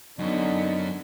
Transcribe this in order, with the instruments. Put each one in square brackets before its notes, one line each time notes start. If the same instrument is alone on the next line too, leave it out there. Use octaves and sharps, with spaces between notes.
[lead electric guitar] F#2 C#4 [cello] D3 B3 [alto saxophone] D#4